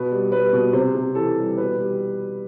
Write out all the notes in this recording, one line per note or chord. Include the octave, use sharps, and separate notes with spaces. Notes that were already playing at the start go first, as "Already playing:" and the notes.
Already playing: B2 B4
G3
G3 B4
B2
C3 C5
C3
E3 A4
G3
B2 B4
G3